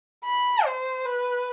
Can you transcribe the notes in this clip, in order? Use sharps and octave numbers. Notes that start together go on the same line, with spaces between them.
B5
C5
B4